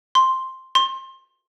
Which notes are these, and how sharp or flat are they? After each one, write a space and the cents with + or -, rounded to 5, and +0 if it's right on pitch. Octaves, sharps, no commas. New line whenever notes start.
C6 +5
C6 +25